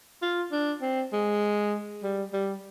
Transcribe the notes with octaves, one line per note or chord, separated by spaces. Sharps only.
F4
D4
C4
G#3
G3
G3